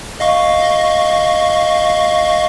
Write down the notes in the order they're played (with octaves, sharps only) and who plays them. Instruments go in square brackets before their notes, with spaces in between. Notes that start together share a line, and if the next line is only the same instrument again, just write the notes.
[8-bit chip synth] D#5 F5 C#6